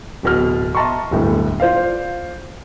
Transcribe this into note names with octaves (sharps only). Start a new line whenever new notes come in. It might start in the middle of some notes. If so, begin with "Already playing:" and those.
D1 B2 F6
D#5 E5 A5 A#5 C6 C#6
D1 G1 A2
F4 C5 D5 F5